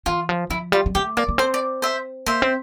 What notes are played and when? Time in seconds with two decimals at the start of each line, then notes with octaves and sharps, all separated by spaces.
0.06 E3 F4
0.29 F3
0.50 F3 E4
0.72 G3 F4
0.86 G3
0.95 A3 G4
1.17 A#3 D5
1.29 A#3
1.38 C4 C5
1.54 D5
1.82 C5 E5
2.26 A#3 C5 E5
2.42 C4